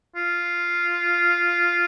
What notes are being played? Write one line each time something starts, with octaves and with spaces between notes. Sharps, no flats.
F4